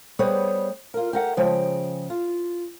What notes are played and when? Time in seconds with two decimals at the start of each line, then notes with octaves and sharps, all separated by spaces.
0.19 G3 B3 G#4 C5 C#5
0.94 F4 A#4
1.13 G4 A#4 F#5
1.37 C#3 F3 G#3 G5
2.10 F4